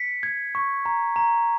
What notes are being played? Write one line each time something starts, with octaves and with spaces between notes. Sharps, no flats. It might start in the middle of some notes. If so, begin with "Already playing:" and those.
Already playing: B6 C#7
G#6
C#6
A#5
A#5